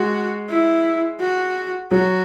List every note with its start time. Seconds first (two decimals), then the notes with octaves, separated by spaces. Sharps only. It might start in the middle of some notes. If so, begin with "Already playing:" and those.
Already playing: G#3 F#4
0.49 E4
1.19 F#4
1.91 F#3 F#4